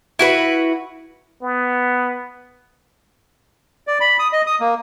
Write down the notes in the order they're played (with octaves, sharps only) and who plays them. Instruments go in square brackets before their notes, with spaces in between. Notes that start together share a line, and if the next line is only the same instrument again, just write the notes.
[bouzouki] E4 F#4 B4
[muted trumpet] B3
[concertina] D5
B5
D#6
D#5
D#6
A#3